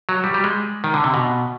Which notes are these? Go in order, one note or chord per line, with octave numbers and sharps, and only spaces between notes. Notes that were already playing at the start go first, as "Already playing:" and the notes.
F#3
G3
G3
G#3
D#3
D3
C3
B2